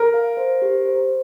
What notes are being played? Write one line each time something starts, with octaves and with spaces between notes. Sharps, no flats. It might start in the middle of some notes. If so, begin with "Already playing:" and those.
Already playing: A#4
F5
C5
G4
C5